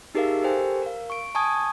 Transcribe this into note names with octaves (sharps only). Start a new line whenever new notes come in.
D#4 G4 G#4 A#4 E5 F5
G4 A4 A#4 C5 G5 G#5
A#4 F5
C#6 D7
G#5 A5 C#6 D#6 G#6